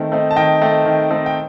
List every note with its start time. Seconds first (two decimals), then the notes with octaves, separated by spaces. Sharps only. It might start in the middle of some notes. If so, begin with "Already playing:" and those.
Already playing: D#3 A3 C4 D#4
0.12 A3 C4 D#4
0.31 A5
0.36 D#3 D#5 G5
0.62 A3 C4 D#4
0.86 D#3
1.10 A3 C4 D#4
1.26 G5